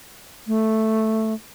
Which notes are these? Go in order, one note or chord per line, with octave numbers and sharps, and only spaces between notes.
A3